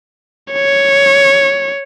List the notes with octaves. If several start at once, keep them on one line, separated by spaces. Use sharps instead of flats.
C#5